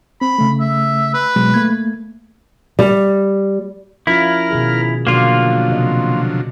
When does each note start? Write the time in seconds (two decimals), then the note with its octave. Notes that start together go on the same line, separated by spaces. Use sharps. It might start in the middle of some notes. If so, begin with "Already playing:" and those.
0.21 C4 B5
0.38 C#3 A3
0.60 E5
1.14 B4
1.36 B2 F#3 G#3
1.54 A3 A#3 G#6
2.79 G3
4.07 F3 C#4 E4 F4 A#4 F6
4.51 B2 D#3 G#4
5.07 B2 D3 F3 F#3 A#3 F4 F#4 D5
5.70 C3 D#5